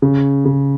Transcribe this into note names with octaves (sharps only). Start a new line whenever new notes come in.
C#3
C#3